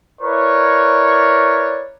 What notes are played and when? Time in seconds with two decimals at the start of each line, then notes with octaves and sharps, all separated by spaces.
0.21 E4 A#4 B4 C#5 D5 C#6